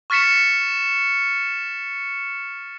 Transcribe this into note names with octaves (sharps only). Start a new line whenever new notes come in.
C#6 F6 A6 B6 C#7 E7